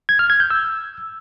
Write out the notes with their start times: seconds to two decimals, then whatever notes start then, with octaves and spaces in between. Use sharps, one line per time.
0.09 G#6
0.19 F6
0.30 G#6
0.40 G6
0.50 E6